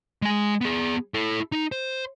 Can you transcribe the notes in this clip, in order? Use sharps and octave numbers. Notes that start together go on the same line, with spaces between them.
G#3 G#5
B3 G#4
E4 A4
D#4
C5